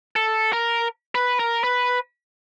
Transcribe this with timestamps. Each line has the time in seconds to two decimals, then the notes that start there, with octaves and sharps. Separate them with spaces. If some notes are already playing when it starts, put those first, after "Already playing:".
0.16 A4
0.53 A#4
1.15 B4
1.39 A#4
1.64 B4